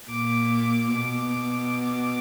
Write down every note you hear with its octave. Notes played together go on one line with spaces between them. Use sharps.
A#2 D6
B2 D6